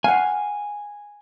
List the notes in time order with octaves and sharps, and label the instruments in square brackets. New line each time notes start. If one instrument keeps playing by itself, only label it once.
[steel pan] F5 F#5 [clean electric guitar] G#5